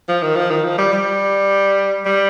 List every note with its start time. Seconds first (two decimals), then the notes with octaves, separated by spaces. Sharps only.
0.08 F3
0.22 D#3
0.35 F3
0.50 D#3
0.65 F3
0.78 G3
0.92 G3
2.06 G3